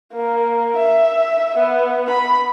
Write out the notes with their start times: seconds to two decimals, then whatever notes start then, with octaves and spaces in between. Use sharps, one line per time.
0.13 A#3
0.76 E5
1.58 B3
2.10 B5